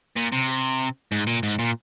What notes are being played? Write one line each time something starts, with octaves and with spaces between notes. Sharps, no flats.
A#2
C3
G#2
A#2
G#2
A#2